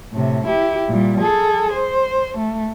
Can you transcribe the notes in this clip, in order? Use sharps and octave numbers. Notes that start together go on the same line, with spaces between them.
A2 C3
E4 G4
A#2 G3
G#4 A4
C5
A3